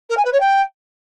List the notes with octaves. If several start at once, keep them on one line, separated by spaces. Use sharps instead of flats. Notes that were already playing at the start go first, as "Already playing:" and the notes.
A#4
G#5
B4
C#5
G5